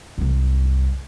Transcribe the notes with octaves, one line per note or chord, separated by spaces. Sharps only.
C2 F#2